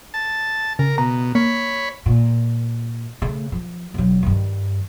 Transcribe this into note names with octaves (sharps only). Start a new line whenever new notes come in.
A5
C#3 A#4
B2 A#5
A#3 C#5 B5
A#2
C#3 A3
F3
E1 F#3
G2 D#3